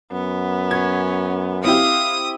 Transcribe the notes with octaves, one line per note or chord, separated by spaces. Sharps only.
F#2 B3
C#4 G#6
C4 E4 G4 F5 D#6